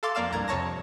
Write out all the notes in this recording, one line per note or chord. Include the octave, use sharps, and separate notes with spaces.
A4 F5 C6 D6 A6
F2 A#3 D5 F5 E7
C2 G2 A#5 G#6
F2 C3 C#5 A5 A#6